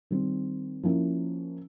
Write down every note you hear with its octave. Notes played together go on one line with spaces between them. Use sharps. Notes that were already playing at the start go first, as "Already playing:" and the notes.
D#3 G3 C4
F3 A#3 C#4 E4